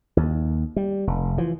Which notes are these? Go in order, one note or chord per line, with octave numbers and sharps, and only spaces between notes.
D#2
G3
F1
E3 F3